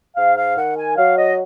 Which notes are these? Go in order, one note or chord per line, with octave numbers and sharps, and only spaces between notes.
G#2 F5
F5
D#3 F#5
G#5
F#3 F5
D#5